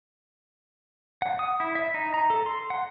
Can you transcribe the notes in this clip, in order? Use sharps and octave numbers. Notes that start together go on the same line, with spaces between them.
F#5
D#6
E4
E5
D#4
A#5
A4
C6
F#5